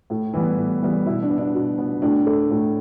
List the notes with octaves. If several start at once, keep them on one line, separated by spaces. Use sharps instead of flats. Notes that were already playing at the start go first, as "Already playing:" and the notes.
A2
E3 G3 B3
A2
E3 G3 B3
B2 E4
D4
B3
D4
B2
B3
A2 D4
A3
A2